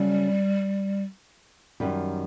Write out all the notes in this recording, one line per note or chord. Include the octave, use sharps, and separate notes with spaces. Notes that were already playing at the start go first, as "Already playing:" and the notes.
Already playing: C#3 F#3 G3 A3 C#4
F#2 D#3 G3